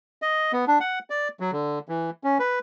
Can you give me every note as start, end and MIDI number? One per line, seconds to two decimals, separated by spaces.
0.22 0.52 75
0.53 0.65 59
0.67 0.79 62
0.80 0.99 78
1.10 1.28 74
1.40 1.51 54
1.52 1.79 50
1.89 2.10 52
2.24 2.38 61
2.39 2.59 71